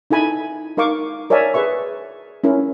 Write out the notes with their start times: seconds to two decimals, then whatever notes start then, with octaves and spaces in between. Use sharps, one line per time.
0.10 D#4 E4 A4 G#5 B5
0.77 D#4 A#4 F5 C#6 D6
1.30 A#4 C#5 D5 E5 G#5 A#5
1.54 G#4 B4 E5 C#6
2.44 C#4 E4 A#4